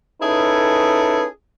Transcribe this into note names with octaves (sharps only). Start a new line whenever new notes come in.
C#4 D#4 E4 G#4 A4 B4